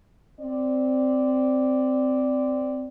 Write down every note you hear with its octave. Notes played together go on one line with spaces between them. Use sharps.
C4 D5